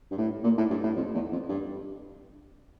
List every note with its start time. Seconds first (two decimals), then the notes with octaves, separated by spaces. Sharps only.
0.11 G2
0.18 A2
0.43 A#2
0.57 A2
0.70 G2
0.83 A2
0.96 F2
1.14 E2
1.32 F2
1.49 G2